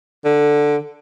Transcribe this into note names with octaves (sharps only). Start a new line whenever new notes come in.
D3